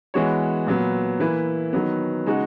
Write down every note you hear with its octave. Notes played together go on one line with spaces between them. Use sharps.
E3 G#3 B3 F#4 C#5
A#2 F#3 B3
E3 A#3 E4 B4
D#3 F#3 B3
C#3 G#3 D#4 F#4